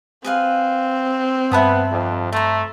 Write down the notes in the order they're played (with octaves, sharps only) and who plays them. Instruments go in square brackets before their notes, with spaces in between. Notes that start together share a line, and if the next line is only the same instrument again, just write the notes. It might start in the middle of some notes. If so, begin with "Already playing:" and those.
[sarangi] C4 [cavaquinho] G#4 B4 F5
[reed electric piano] G2 A5 F#6 [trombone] B3 [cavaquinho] E5 B5 D#6
[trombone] F2
[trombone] A3 [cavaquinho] C5 A#5